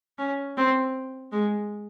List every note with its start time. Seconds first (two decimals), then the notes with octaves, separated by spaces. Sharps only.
0.19 C#4
0.57 C4
1.32 G#3